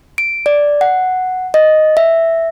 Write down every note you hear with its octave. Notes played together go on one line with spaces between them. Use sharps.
D7
D5
F#5
D#5
E5